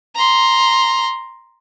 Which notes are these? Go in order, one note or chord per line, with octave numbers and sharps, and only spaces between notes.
A#5 C6